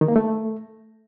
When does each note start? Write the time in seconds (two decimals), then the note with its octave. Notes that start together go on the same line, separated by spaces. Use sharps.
0.01 D#3
0.08 A#3
0.16 A3